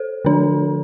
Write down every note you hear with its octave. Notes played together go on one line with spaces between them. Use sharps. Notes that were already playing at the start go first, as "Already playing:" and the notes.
Already playing: A4 C5
D3 F3 D4